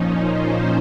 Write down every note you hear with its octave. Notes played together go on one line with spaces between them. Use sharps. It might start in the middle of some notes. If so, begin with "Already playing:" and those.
Already playing: A#2 F3 C#4 D#4
C5